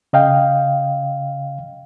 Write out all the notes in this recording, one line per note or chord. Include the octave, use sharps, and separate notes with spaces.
C#3 D#5 F5 G5